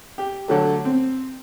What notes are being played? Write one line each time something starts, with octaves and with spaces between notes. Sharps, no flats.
G4
D3 F#3 A3
C4